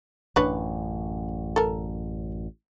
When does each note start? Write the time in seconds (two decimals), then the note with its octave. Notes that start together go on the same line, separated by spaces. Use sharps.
0.36 A1 F#2 D4 B4 C#5
1.56 A4 A#4